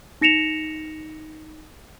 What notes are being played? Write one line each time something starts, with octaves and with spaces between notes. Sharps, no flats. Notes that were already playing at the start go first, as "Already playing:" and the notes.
D#4 A#6 C#7 E7 F7